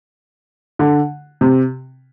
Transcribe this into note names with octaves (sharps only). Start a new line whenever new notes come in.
D3
C3